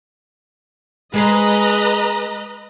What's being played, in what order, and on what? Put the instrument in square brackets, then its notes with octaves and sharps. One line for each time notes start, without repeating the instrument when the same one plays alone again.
[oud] G#3 G#4 C5 [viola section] B4 D#5 A#5